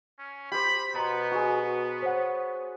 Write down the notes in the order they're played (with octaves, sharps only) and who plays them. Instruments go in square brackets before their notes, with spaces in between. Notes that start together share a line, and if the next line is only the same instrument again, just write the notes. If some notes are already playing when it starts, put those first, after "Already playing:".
[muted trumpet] C#4
[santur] G4 C5 [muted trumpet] B5
[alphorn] B2 [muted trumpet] B3 [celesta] A#5 C6
[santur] F#4 G#4
[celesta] C5 C#5 F#5